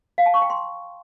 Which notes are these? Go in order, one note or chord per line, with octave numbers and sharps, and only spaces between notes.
F5
A5
C#6
G5
C6